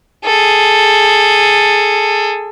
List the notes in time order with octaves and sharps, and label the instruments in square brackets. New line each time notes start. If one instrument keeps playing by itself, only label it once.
[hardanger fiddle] G#4 A4